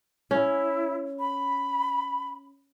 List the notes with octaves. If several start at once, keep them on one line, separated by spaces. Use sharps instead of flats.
C#4 E4
B5